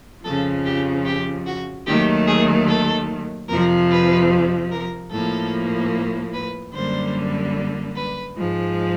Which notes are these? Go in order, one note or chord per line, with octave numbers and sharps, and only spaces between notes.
F2 C#3 F3 A4
G4
G4
F#4
D#2 D#3 F#3 A3 G4
G#4
A4
F2 C3 F3 A#4
B4
A#4
A2 F3 A#3 A4
B4
F#2 D3 G3 A#3 C5
B4
G#2 F3 G#3